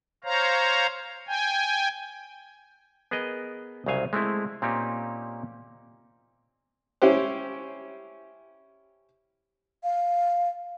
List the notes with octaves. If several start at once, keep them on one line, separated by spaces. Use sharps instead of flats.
C5 C#5 F5 A#5
G5 G#5
B3 G#4 A#4 D#5
C2 C#3 F#3 C5 F5 G#5
G#3 A3 C4 E4
A#2 A#3 C4 C#4 D#4 G4
C#4 E4 G4 C5
F5